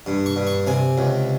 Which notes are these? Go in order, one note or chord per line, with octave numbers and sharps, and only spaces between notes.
G2
C#6
G2
C#6
C3 G#5
C#2